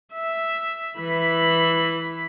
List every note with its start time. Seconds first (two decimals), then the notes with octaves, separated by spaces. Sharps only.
0.13 E5
0.99 E3 B5